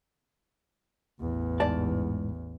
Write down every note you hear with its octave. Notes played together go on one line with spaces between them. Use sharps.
A1 E2
G#2 D5 A5